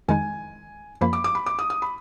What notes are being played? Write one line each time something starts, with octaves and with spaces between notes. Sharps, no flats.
F2 D#3 G#3 D#4 G#5
F#2 F3 A#3 B5
D6
D6
B5
D6
D#6
D#6
B5